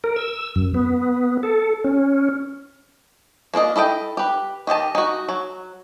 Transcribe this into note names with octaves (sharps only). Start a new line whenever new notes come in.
A#4
E6
F#2
B3
A4
C#4
A#3 D4 F4 D#5
E4 A4 D#5 G5
G4 B4
D#3 G4 D#5 A5
D#4 F#4
F#3